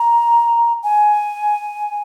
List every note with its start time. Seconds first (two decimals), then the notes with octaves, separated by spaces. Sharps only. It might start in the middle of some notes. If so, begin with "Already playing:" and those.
Already playing: A#5
0.84 G#5